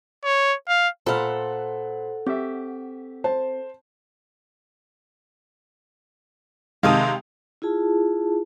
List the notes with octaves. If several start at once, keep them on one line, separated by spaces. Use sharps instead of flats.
C#5
F5
A#2 A4 C5 F#5 B5 F6
C4 G4 E5
C5 A5
C3 D#3 G#3 F5 A5 D#6
E4 F4 G#4 A5